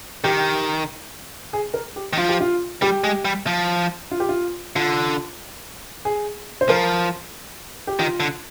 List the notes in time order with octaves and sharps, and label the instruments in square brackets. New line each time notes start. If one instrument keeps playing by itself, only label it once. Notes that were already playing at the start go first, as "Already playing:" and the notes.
[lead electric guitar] D#3 [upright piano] G4
[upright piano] G#4
A#4
G4
[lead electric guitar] D#3
[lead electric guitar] F3 [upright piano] F4
[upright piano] G4
F4
[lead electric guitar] G3 [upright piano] G4
[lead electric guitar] G#3
G3
F3
[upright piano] F4
G4
F4
[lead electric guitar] D3 [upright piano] F4
[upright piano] G#4
C5
[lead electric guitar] F3 [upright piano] A#4
[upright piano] G4
[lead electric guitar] D#3 [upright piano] F4
[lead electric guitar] D3